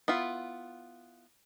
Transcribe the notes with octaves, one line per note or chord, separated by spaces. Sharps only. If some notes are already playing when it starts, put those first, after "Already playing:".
B3 E4 F4